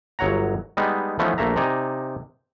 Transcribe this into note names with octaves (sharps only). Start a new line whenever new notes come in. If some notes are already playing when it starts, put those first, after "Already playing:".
G1 F#3 C#5 F#5 A#5
G3 G#3 B3 D#4
E3 F3 A3 B3 C#4 D#4
A#1 A3 A#3 E5 A#5
C3 D#4 D5 G#5 A#5